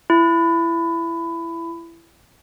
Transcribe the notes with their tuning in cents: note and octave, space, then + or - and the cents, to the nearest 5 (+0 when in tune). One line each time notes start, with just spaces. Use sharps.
E4 +20